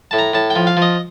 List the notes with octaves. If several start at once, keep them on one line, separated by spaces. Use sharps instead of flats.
A2 A5
A#5
A2 A5
G5
F3
F5
F3 D#5